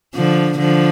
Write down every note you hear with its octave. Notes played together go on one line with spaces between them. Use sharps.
D3 F3
D3 F3